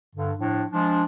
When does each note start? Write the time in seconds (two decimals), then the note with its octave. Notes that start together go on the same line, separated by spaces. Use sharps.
0.15 G2 D3
0.38 A2 F3 D4
0.72 F3 G#3 D4